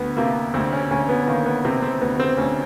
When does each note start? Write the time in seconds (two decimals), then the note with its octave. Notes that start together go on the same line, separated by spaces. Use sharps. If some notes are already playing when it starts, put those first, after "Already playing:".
Already playing: D2 B3
0.17 C3 A#3
0.54 D2 C4
0.73 C#4
0.91 D2 C#4
1.09 B3
1.27 D#3 A#3
1.46 B3
1.65 C3 C4
1.82 C4
2.01 D2 B3
2.20 C4
2.37 D2 C#4